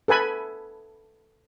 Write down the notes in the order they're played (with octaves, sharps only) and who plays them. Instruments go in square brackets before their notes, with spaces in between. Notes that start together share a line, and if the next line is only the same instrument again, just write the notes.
[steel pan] A4 B4 G#5 B5